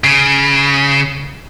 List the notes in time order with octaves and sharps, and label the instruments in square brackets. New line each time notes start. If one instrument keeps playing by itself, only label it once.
[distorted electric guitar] C#3